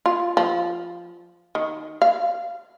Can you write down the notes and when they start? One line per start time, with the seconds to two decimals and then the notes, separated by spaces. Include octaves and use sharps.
0.06 F4
0.37 F3
1.55 D#3
2.02 F5